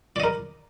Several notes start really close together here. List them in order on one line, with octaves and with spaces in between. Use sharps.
D5 D#5 A#4